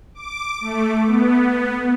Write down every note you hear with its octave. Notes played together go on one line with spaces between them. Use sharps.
D6
A3
B3